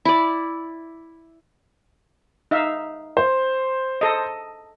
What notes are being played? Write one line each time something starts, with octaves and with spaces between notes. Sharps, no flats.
E4 D5
D#4 E5 F5
C5
A4 D#5